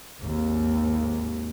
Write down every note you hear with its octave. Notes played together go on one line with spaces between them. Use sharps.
G#1 D#2